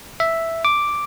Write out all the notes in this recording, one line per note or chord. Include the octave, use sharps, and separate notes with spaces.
E5
D6